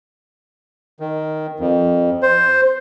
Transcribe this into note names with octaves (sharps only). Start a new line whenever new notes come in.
D#3
F2
C5